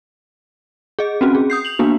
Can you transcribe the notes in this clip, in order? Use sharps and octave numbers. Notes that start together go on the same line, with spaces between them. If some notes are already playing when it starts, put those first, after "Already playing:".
G#4 D#5
C4 C#4 F#4
G#4
D#6 G6 C7
F7 F#7
A#3 B3 D4 F#4